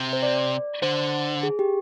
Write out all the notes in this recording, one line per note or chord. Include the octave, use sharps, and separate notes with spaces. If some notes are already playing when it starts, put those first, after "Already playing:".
Already playing: C3
C5
D5
D3 C5
G#4
G4